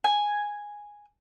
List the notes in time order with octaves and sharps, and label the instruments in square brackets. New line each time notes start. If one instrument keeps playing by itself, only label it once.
[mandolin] G#5